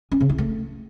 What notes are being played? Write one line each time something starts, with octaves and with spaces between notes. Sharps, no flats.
C#4
C#3
E4
A3